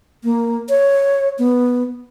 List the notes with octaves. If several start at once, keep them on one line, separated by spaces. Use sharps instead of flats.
A#3
C#5
B3